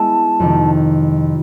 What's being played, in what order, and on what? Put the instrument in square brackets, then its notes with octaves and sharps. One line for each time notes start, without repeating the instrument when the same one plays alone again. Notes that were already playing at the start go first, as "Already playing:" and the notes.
Already playing: [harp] G#3 B3 E4 G#4 [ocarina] A5
[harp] F2 C3 D#3